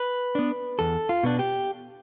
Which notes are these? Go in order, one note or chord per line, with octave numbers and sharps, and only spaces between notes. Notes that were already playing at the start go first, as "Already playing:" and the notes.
Already playing: B4
B3 D4
E2 A4
F4
B2 B3 D4
G4